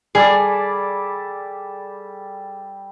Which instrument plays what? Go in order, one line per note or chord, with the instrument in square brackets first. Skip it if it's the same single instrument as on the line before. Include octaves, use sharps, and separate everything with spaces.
[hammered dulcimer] G3 A4 D5 [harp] G#4